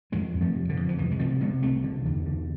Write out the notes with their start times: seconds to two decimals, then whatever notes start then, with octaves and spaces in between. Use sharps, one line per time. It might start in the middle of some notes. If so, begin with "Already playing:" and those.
0.12 F2 E3 G#3
0.34 F2
0.41 F3 A3
0.55 C3
0.69 D3 F3
0.77 F2
0.89 F3
0.98 C2 E3
1.11 G#3
1.19 C3 F3 A3
1.40 C3 G#3 B3
1.62 C2 A3 C4
1.84 D3
2.05 E2
2.26 D3